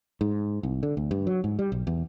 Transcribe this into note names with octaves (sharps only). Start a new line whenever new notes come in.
G#2
C2
D3
D2
G2
F#3
G#2
G3
B1
E2